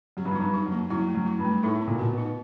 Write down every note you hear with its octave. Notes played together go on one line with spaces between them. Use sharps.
F#2 G4
G2
F#2
D#4
G2
D#4
F#2
A#3
F#2 E4
A3
F#2
E4
G2
A3
A2 D#4
B3
A#2
B2
A#2 F#4
B2
D#4